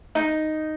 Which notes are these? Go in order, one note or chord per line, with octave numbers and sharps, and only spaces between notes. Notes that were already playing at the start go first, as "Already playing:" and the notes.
D#4